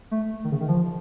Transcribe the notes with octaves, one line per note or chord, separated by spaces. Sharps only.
A3
D#3
C#3
D#3
F3